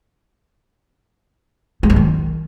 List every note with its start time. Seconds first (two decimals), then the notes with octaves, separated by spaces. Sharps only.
1.83 G#3
1.90 E3
1.96 D#3